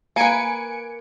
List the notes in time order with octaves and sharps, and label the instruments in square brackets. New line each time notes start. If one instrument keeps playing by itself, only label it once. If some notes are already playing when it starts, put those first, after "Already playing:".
[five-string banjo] A#3 B4 [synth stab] G#5 C#7 D7